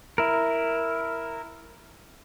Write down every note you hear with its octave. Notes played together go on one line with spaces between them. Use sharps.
E4 A#4